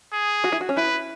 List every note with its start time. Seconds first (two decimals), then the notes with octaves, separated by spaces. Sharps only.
0.13 G#4
0.44 F#4
0.52 E4
0.61 F#4
0.69 C#4
0.77 E4 B4